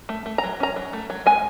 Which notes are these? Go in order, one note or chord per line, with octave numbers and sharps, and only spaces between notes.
A3
A3
A#5
F#3
C#4 A#5
F#3
A3
F#3
G#3 G#5